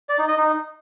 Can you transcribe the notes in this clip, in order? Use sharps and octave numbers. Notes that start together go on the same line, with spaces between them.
D5
D#4
D#5
D#4